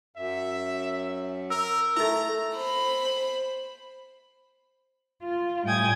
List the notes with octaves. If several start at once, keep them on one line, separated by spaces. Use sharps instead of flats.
F#2 E5
A#4 E6
A3 E4 A4 A#5
C5 B5
F4
A2 G3 G5 G#5 D#6 G#6